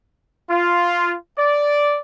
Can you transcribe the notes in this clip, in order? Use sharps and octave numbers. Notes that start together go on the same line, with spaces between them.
F4
D5